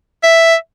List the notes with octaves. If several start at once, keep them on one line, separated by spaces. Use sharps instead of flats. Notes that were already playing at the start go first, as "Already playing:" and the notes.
E5